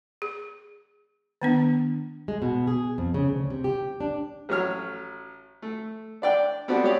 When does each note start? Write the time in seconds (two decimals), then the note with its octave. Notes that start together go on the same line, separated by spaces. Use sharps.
0.22 G#4
1.42 D#3 B3 D4
2.28 G#3
2.42 B2
2.67 G#4
2.98 F2
3.14 C#3
3.29 D2
3.50 C3
3.64 G4
4.01 D4
4.49 A1 F#3 C#5 F6
5.62 A3
6.22 D4 D5 G5
6.68 B3 C4 D4 F#4 G4 A4
6.83 G#3 G4 C#5 D5